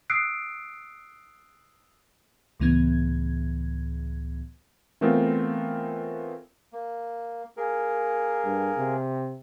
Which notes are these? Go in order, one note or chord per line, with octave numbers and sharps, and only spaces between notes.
D#6 E6 F#6 C7 D7
C#2 A2 E3 B3 G#6
E3 A3 B3 C4 F4 A#4
A#3
A#3 G#4 A#4
G2
C3